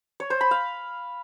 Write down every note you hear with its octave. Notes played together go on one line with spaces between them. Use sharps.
C#5
C5
B5
F5